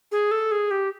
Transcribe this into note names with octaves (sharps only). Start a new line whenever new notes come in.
G#4
A4
G#4
G4